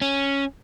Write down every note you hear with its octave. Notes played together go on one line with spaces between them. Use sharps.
C#4